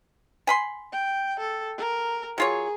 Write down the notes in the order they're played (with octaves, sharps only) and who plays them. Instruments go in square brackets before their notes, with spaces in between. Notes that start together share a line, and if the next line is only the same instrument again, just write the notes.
[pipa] G#5 B5 C6
[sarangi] G5
A4
A#4
[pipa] F#3 F4 C#5 [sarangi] G#4